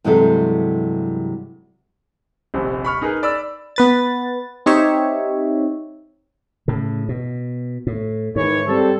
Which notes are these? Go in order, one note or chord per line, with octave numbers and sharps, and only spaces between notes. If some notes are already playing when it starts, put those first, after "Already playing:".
G2 C3 E3 F#3 G#3 A4
D#1 A#1 C3
B5 C#6 F6
D#4 G#4 A#4 B4
D5 B5 E6
B3 B4 A6
C4 D#4 G4 C#5 E5
A2 C#3
B2
A2
G#2 D#3 E3 C#5
G3 C4 A4